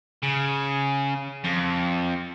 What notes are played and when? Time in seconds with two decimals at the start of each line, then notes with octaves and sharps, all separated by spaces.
0.23 C#3
1.45 F2